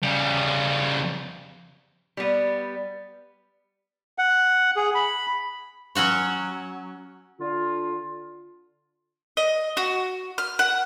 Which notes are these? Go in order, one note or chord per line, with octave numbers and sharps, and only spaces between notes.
C#3 G3
G3 B3
F#5
G#4
B5
F#3 C#4 F#4 C#5
D3 F4
D#5
F#4
F6
F#5